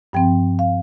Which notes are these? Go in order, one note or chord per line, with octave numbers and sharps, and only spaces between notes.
G2 F3 C4 G5
F5